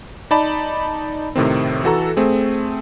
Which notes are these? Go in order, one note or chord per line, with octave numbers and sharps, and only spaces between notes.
D#4 D5 A5 B5
A2 C3 D#3 C4
E3 F#4 A4 A#5
A3 C4 G#4